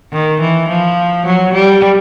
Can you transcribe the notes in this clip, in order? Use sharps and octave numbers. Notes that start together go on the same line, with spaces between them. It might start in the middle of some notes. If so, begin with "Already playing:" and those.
D#3
E3
F3
F#3
G3